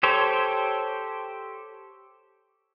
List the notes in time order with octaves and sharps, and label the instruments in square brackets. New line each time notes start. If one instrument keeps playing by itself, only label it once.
[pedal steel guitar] G4 A4 C5 C#5